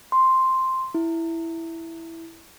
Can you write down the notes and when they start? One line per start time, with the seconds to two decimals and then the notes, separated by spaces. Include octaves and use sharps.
0.12 C6
0.95 E4